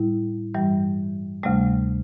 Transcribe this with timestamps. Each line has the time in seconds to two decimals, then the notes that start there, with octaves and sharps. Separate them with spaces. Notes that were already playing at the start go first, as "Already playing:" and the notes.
Already playing: A2 G3 E4
0.54 G2 E3 G3
1.43 D2 C3 G3 A3